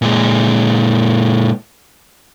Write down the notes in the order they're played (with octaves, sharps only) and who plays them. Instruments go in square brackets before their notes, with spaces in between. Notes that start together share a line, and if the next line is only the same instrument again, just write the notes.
[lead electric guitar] A#2 G#3